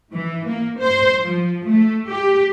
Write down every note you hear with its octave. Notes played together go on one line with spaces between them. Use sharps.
E3
A#3
C5
F3
A3
G4